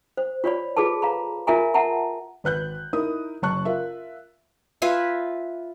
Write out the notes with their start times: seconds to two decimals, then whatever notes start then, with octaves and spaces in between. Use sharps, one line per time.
0.17 C5
0.44 F4 C#5 D5 B5
0.76 F4 G#4 A4 B4 A5
1.02 F5 A#5 B5
1.47 F4 A#4 E5 G#5 A#5
1.74 E5 F#5 A5 A#5
2.44 G#1 B4 F#6 G6
2.93 D#4 E4 A#4 D#6
3.42 F#1 F#3 A5 C#6 F#6
3.65 F4 A#4 E5
4.82 F4 B4 E5 G#5